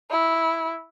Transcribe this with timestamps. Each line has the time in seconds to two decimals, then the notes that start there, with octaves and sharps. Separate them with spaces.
0.11 E4